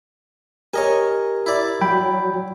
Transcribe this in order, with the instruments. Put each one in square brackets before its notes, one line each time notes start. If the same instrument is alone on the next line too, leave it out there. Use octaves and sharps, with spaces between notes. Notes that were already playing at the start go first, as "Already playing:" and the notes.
[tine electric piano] G4 A#4 [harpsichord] C#5 D#5 G#5
[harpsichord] E4 D5
[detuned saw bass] F#3 [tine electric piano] G5 B5